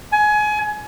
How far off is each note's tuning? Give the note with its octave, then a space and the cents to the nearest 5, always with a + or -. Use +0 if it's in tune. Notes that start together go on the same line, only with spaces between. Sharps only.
G#5 +25